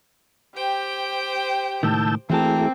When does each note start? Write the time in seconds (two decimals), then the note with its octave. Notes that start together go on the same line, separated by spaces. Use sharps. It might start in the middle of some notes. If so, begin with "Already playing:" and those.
0.56 G4 C5 G5
1.83 C#2 A2 D#3 A5 E6 G6
2.30 E3 A3 A#3 C4 E4 F#4 G#4 A5